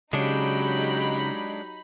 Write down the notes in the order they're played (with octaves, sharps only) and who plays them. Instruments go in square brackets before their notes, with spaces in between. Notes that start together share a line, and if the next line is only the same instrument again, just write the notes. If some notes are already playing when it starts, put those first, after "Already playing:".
[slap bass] C#3 [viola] F#3 G4 [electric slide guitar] G#3 D4 [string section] D#4 B5